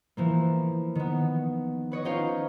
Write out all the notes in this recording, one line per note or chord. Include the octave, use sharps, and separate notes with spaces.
E3 F3 A#3
D#3 B3
B4 C#5 D#5
C#4 D#4 F4 C5 C#5 F5